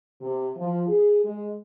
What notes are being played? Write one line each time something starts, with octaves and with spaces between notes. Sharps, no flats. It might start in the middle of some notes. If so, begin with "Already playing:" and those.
C3
F3
G#4
G#3